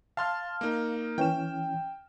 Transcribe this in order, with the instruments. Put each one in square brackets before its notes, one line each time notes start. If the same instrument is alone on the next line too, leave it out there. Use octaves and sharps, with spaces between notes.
[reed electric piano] F5 [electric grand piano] A5 C6 F6
[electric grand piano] A#3 D#4
[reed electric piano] E3 C#4 [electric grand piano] G5 E7